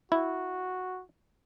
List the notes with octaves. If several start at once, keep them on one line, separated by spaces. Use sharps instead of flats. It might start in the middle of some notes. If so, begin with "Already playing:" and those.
E4 F#4